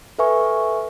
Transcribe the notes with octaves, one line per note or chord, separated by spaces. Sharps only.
A4 B4 E5 G#5 C#6